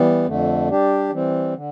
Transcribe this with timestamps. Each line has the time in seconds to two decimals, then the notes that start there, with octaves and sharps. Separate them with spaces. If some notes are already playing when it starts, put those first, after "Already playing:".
Already playing: E3 G3 B3
0.26 F2 D3 A3
0.69 G3 D4 G4
1.12 E3 G3 C4
1.55 D3